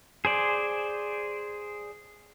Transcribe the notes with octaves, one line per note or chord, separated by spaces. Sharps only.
G#4 C5 D5